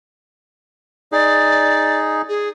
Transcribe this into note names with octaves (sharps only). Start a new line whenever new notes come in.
D#4 G#4 D5
G#4